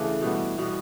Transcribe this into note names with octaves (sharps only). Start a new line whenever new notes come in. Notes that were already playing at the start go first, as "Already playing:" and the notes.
Already playing: C#3 E3 A3 D4
B2 G3 B3
B2 G3 B3